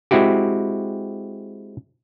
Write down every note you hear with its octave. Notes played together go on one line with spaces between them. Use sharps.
G#3 C4 E4 F#4 G4